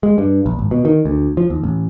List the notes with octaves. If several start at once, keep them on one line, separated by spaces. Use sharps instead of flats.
G#3
G2
A#1
G#1
B2
D#3
D2
F3
D#2
A1